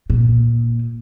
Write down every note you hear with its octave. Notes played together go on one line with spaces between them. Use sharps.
A#2